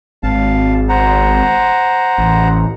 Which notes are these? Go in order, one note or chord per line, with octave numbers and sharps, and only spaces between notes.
G#1 F5 A5
C5 F#5 A#5
A1